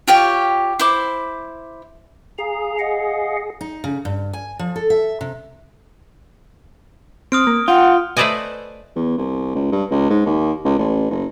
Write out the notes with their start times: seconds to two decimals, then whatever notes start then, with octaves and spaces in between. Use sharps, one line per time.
0.08 F4 G4 C#5 G5
0.79 E4 C5 D6
2.38 G#4 F5 A#5
2.79 D#5 F5 F#5
3.61 D#4
3.84 C#3
4.05 G2
4.33 G#5
4.59 F3
4.76 A4
4.90 E5
5.21 C3
7.32 C4 D#6 F6 D7
7.47 A#3
7.68 F4 F#5 G5
8.17 A3 B4 C5 D5 D#5 G#5
8.96 E2
9.18 C2
9.55 C#2
9.72 G2
9.91 C#2
10.10 G#2
10.26 D#2
10.65 C#2
10.79 A1
11.11 F#1